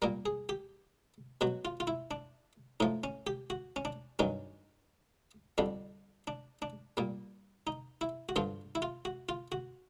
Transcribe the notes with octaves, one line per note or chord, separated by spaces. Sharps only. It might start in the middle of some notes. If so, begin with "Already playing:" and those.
A#2 G3 A#4
G#4
G4
B2 F#3 F#4
F4
F4
E4
D4
A2 F3 D#4
C#4
G4
F#4
C#4
D4
G2 D#3 F#3 C#4
F2 D3 G3 D4
D4
D4
A#2 G3
D#4
E4
F#4
G2 D3 F3 F4
E4
F4
F#4
F4
F#4